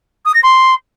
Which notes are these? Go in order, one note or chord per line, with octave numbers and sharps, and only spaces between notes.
D#6
A#6
C6